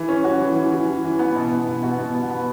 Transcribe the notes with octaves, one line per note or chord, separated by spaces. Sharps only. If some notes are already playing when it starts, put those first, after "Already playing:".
Already playing: E3
C#4
C#4 F#4
E3
E3
E3
E3
E3
B3
B2
B2
B2
B2 F#4
B2
B3
B3